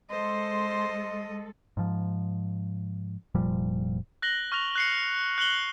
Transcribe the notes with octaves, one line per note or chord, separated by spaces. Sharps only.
G#3 A4 C5 D#5 C6
G#2 F3
F1 A#2 F3 G3
F#6 A#6 F#7 G7
C#6 F6 F#6 A#6 F7
F#6 C7 C#7
F#6 C#7 F#7 G7